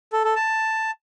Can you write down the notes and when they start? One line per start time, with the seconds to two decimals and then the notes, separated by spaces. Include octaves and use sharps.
0.13 A4
0.24 A4
0.36 A5